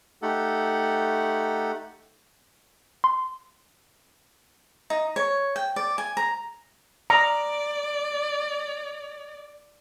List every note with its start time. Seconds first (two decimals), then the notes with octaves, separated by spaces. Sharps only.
0.22 A3 D#4 G4 A4 F#5
3.04 C6
4.90 D#4
5.16 C#5
5.56 G5
5.76 D5
5.98 G#5
6.17 A#5
7.10 D5 A#5